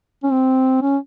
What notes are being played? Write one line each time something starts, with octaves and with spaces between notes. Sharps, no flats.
C#4
C4
C#4